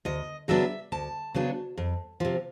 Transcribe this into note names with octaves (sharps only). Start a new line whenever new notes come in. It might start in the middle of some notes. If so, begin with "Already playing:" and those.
D2 D#5
C#3 F#3 B3 D4 E5
D2 A5
C#3 F#3 B3 D4
F2
C3 F3